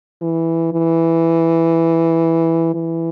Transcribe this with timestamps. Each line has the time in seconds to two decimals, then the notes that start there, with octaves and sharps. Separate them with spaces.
0.22 E3
0.73 E3
2.74 E3